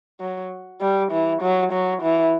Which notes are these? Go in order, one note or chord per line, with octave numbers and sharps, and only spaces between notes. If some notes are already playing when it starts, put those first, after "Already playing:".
F#3
G3
E3
F#3
F#3
E3